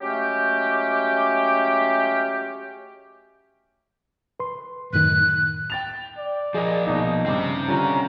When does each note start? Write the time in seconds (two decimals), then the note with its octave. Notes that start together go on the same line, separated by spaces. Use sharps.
0.01 F#3 G#3 A3 C#4 G4
4.40 B4 C6
4.93 F#2 A2 D#3 F#6
5.70 G5 A6 F7
6.18 D5
6.54 F3 G#4 A#4 D#5
6.87 A#1 B2 D#4
7.26 G2 C#3 C4 G4 D6
7.68 D3 G3 C#4 F4 A#5